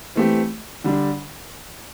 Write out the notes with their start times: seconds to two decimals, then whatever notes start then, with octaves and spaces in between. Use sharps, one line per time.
0.15 E3 A3 C4 G4
0.84 D3 G3 D4